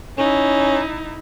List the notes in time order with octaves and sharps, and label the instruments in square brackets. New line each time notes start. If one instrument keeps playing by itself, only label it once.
[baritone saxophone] C#4 [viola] D#4 E4